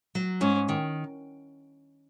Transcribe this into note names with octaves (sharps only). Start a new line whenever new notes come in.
F#3
G#2 C#4
D#3